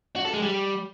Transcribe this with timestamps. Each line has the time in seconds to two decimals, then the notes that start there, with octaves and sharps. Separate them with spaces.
0.16 F#4
0.25 A4
0.34 G#3
0.42 G3